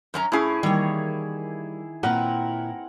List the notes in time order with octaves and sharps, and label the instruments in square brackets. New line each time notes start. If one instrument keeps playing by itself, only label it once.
[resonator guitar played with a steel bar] F#2 C#4 A#5
[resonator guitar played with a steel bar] A2 C#4 [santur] E4 G#4
[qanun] D#3 C#5 [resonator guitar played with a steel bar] E3 [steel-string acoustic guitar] G3 A#3
[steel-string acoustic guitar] A#2 E4 [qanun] C4 B4 [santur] A#4 F#5